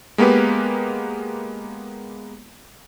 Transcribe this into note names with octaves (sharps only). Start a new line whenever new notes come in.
G#3 A#3 B3 G4 B4